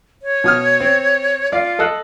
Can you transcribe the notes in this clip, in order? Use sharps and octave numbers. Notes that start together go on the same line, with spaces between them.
C#5
B2 D#6 F6
C4
F4 D5 F5
A4 D#5 F#6